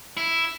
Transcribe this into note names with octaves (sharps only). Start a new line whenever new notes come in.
E4